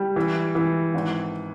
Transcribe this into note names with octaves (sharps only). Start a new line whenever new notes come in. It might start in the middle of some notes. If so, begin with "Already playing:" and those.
Already playing: G3
E3
E3
G#1